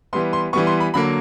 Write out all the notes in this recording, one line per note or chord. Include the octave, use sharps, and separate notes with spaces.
E3 G3 B3 C6
C6
E3 G3 B3 C#6
C6
B5
D3 F#3 A#3 B5